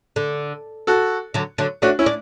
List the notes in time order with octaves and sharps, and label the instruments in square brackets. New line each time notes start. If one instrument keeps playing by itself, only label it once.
[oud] D3
[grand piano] F#4 A4
[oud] D3 F#3
D3 F#3
[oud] A3 C#4 [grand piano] D4 F#4
[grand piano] C#4 E4
[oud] D4